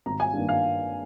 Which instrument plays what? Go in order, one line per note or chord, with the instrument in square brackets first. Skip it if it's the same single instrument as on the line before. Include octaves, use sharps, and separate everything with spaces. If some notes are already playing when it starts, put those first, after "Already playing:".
[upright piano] G#1 A#5
G#5
G2 D#3 A#3 D4
F5